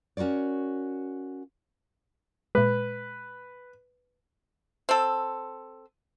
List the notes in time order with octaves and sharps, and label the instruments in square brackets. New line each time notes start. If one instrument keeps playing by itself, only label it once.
[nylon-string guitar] C#4 F#4 A#4 C#5 D5
[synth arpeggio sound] A#2 G#3 [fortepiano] B4
[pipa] C4 A4